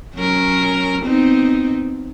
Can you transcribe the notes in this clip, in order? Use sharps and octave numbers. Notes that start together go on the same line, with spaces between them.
F#3 C#4 A#4
B3 C4 D#4